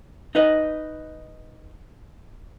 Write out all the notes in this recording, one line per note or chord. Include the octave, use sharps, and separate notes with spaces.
D#4 B4 D#5